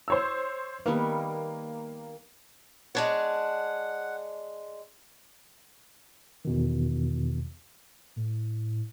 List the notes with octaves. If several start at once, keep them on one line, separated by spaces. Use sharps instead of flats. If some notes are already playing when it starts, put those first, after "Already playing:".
C5 C#5 E6
D#3 G3 A#3 B3
G#3 D4 C#5 F#5
E2 B2 D#3
A2